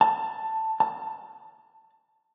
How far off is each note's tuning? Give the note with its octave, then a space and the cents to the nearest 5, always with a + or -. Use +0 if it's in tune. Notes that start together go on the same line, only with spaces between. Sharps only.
A5 +10
A5 +15